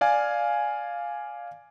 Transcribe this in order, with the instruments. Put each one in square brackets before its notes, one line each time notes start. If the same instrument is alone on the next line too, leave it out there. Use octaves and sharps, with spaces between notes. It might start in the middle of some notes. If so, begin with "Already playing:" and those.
[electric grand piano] D5 F5 G#5